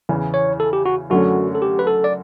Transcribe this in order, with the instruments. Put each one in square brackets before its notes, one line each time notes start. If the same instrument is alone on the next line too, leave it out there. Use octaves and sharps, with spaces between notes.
[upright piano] E2 C#3 E3
[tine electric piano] C#5
A4
G4
F#4
[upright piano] F#2 D3 F#3 A3 C#4 [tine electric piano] F#4
[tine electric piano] A4
G4
B4
A4
D5